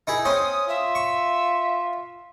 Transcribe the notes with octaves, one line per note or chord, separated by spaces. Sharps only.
D#4 E4 G#4
C4 C#4 C6 D#6
F4 E5
C#6